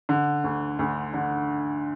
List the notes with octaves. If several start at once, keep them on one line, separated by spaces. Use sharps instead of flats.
D3
D2
D2
D3